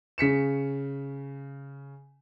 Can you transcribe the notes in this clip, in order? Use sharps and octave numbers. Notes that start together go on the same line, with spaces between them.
C#3 B6 C#7 E7